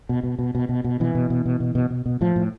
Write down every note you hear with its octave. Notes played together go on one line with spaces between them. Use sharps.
B2
B2
B2
B2
B2
B2
B2 E3
B2
B2
B2
B2
B2
B2
B2
A2 F3
A2